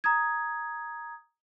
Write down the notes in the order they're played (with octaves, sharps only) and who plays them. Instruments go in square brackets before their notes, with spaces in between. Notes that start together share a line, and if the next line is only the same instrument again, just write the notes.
[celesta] A#5 D#6 G#6